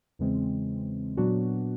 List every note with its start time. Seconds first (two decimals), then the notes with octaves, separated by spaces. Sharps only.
0.19 E2 C#3 E3 G#3 C4
1.17 A#2 F#3 B3 D4 F#4